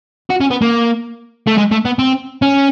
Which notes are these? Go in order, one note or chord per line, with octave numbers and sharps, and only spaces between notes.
F#4
C#4
B3
A#3
A3
G#3
A3
B3
C4
C#4